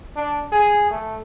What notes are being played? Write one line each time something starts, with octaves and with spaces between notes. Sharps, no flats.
D4
G#4
A3